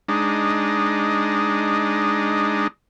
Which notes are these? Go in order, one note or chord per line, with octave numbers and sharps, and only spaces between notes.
G#3 D4 D#4